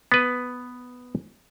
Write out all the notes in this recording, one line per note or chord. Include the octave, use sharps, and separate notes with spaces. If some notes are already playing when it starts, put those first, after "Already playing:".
B3 B4